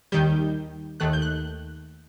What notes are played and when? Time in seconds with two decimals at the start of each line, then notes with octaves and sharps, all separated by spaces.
0.12 D#2 D#3 G3 G6
1.00 D#2 D#3 A3 F#6
1.13 G6
1.22 F#6